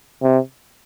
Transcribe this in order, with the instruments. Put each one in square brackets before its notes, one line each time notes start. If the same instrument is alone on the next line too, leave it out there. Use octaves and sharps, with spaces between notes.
[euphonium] C3